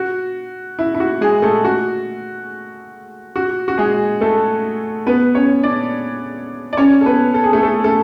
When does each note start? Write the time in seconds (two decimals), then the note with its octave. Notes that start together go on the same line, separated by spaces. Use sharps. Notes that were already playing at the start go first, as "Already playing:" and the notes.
Already playing: F#4
0.79 E4
0.94 E4
1.00 F#4
1.21 G#3 G#4
1.42 A3 A4
1.65 F#4
3.36 F#4
3.68 F#4
3.78 G#3 G#4
4.21 A3 A4
5.07 B3 B4
5.35 C#4 C#5
5.63 D4 D5
6.73 D5
6.77 C#4 C#5
7.01 A4
7.05 B3 B4
7.34 A4
7.44 G#4
7.53 A3 A4
7.63 A3 A4
7.84 A3 A4